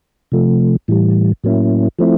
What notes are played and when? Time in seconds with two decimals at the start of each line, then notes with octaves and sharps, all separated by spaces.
0.32 C3 F3 A3
0.88 A2 E3 G3
1.44 A2 F#3 A#3 C#4 E4
1.99 F3 A3 C4 E4